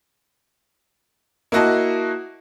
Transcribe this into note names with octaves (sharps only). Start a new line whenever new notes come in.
A#3 E4 F#4 D#5 A5